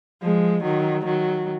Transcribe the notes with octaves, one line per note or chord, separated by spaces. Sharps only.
F3 G#3
D#3 F#3
D#3 F#3